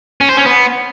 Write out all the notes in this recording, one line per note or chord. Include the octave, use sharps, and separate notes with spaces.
C#4
C5
C#4
B3